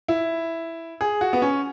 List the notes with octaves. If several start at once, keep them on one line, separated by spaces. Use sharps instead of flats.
E4
G#4
F#4
B3
C#4